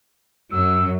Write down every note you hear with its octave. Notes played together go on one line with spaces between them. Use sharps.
F#2 F#3 E6